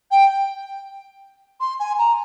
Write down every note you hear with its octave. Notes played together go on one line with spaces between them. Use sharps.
G5
C6
G#5
A#5